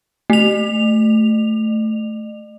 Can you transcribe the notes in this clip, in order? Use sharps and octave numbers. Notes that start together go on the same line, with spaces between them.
A3 F7